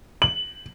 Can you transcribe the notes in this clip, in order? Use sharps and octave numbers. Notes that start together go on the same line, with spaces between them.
F#7